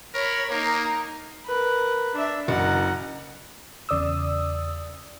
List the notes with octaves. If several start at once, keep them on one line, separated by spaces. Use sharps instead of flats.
A#4 C#5 B5
A#3 D#4 A#4
A#4 B4
D4 E5
F#1 F#5 A#5
E2 C#3 D5 D#6 E6